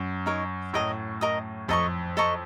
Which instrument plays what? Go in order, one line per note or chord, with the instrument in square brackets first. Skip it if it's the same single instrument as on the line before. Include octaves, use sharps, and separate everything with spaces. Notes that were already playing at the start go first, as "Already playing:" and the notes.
Already playing: [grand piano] F#2
[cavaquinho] D#4 A#4 C#5
[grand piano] A2 [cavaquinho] A#4 D#5 A#5 D#6
[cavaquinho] A#4 D#5 A#5 D#6
[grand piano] F2 [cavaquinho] A4 D#5 A#5 C#6
[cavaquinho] A4 D#5 A#5 C#6